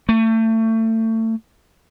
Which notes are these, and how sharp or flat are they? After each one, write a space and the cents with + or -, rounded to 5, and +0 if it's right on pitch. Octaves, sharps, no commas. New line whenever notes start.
A3 +30